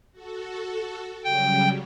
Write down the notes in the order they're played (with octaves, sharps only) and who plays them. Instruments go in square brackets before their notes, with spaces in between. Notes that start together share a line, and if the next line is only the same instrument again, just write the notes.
[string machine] F#4 A4
[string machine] C#3 F#3 G3 [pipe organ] G5